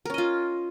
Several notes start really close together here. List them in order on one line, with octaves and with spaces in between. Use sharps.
A#4 C#4 D#5 F4